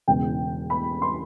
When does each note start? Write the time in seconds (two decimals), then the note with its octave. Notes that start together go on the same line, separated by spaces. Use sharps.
0.08 E1 E2 C#3 G5
0.70 B5
1.02 C6